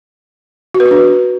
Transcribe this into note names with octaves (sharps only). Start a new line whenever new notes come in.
F#4
B4
F#4
D4